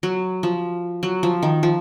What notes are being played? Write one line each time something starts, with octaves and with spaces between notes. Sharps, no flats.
F#3
F3
F#3
F3
D#3
F3